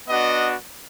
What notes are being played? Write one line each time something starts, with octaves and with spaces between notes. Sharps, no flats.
B3 D4 F#4 D#5